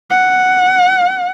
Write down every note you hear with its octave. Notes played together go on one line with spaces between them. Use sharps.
F#5